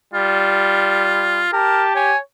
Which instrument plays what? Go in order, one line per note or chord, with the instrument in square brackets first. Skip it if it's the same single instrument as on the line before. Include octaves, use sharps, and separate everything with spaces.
[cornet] G3 [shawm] F4
[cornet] G4 [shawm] A#4 [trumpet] A5
[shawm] C#5 [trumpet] G#5